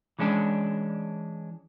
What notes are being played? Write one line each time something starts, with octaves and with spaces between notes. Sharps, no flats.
E3 G#3 C#4 D4